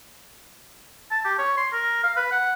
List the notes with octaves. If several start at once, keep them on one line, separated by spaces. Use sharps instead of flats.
A5
G4
C#5
C6
A#4
F5
B4
F#5